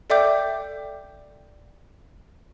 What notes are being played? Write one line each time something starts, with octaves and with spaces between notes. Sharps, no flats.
A4 D5 E5 G5 D6 G6